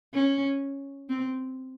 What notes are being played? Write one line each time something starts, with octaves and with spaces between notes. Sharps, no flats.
C#4
C4